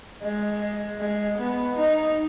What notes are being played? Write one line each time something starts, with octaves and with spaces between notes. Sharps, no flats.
G#3
G#3
B3
D#4